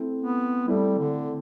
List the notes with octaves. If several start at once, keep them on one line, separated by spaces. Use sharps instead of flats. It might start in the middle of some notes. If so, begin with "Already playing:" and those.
Already playing: A3 C4 E4
B3
G3 A3 C4 E4
D3